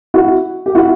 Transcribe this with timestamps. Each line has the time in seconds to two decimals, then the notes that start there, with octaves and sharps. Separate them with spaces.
0.14 E4 F#4
0.66 G4
0.75 E4 F#4